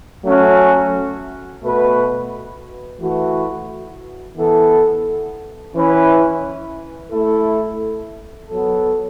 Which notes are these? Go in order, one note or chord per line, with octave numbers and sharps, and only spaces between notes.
F#3 A3 C#4 F#4
B2 A3 F#4 B4
E3 A3 F#4 B4
E3 B3 A4
E3 C#4 E4 B4
A3 E4 A4
F#3 B3 A4